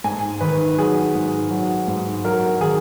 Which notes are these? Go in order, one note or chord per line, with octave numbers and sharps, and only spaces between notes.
G#2 G#5
D#3 B4
F#3 G#4
G#2
F#3
G#2
F#3 A#4
D#3 G#4